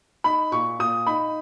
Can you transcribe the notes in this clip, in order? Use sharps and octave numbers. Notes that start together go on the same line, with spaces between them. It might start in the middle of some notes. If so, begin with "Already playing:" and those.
D#4 B5
A#2 C#6
A#2 D#6
D#4 B5